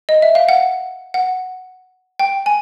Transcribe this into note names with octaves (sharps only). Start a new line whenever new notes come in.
D#5
E5
F5
F#5
F#5
G5
G#5